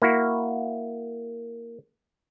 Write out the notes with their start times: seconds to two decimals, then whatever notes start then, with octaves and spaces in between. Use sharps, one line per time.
0.02 A#3 E4 F#4